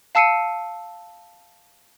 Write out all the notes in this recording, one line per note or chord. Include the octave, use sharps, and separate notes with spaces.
F5 A5 E6 C7 C#7 D#7